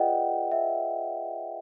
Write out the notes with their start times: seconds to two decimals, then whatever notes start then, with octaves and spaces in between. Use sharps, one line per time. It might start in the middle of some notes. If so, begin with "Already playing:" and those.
Already playing: F4 G#4 B4 D5 D#5 F#5 G5
0.51 E5